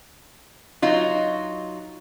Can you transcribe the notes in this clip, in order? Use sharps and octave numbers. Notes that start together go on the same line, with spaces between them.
F#3 D#4 F4